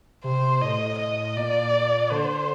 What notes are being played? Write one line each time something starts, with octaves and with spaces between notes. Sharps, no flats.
C3 C5
A2 D#5
D#5
A#2 D5
D3 C5